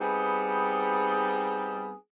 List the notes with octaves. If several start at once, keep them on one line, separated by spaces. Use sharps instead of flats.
G3 B3 C4 D#4 G#4